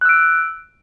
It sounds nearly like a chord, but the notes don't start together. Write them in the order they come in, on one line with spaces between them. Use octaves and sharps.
F#6 E6 D7